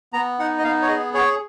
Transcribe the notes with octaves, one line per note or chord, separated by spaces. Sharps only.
B3 A#5
D#4 F#5
D#5
B3 F5
C#5
G#4 D#5
G#4 C#5